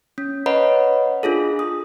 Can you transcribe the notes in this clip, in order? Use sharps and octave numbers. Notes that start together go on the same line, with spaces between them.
C#4
B4 C#5 D#5 F#5 A#5 B5
D4 F4 G#4 A4
D#6